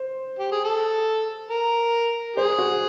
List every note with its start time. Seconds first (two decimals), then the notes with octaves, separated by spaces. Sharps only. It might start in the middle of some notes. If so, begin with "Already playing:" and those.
Already playing: C5
0.39 G4
0.52 G#4
0.65 A4
1.51 A#4
2.36 G#4 C5
2.59 F#4